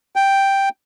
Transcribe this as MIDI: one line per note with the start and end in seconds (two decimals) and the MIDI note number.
0.16 0.69 79